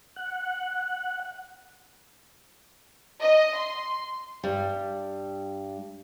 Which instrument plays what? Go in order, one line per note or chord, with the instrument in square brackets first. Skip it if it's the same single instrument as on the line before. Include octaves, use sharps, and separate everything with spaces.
[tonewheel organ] F#5
[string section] D#5
C6
[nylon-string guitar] G2 G3